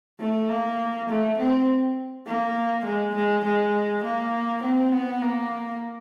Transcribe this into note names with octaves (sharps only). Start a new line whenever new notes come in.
A3
A#3
A3
C4
A#3
G#3
G#3
G#3
A#3
C4
B3
A#3